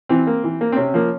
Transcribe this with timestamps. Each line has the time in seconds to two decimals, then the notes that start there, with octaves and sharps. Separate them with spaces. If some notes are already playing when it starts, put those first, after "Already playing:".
0.09 E3 C4
0.27 A#3
0.44 E3
0.61 A#3
0.72 C4
0.77 C3 C#4
0.94 F3 A#3